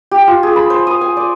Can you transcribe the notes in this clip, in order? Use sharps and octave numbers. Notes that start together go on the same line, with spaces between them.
G4
F4
G#4
B5
C5
D#6
G#5
D5